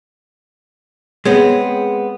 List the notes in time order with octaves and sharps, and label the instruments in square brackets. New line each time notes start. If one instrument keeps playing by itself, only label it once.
[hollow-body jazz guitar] G#3 B3 C4 [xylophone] G#4 C#5